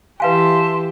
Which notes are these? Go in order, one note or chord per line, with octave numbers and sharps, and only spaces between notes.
E3 G4 B4 E5 F5 G#5 A5 C6